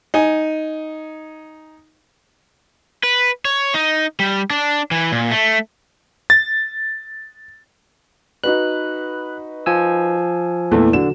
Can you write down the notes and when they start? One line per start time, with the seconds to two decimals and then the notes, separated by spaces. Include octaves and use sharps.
0.14 D#4 G#5
3.03 B4
3.45 C#5
3.74 D#4
4.20 G3
4.50 D4
4.91 E3
5.12 A#2
5.31 A3
6.30 A6
8.44 D#4 F#4 B4 F#6
9.66 F3 G#5 E6
10.71 E2 A#2 E3 A3
10.93 D3 F#3 E7